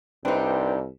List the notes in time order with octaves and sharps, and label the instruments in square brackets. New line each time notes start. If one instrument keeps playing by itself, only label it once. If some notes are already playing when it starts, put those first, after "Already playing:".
[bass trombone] C2 [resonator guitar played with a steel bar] D4 D#4 [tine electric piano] B4 C5 G5